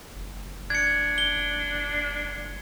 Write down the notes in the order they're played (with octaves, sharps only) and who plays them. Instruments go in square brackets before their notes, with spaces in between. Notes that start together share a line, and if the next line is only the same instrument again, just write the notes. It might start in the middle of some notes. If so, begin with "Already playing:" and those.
[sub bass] F#1
[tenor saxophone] D4 [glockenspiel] G#6 C#7
[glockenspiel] G7